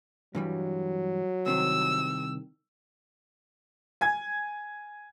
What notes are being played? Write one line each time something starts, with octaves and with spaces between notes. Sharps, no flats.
G2 E3 F#3 G3
C2 C3 D#3 E6
G#5 G#6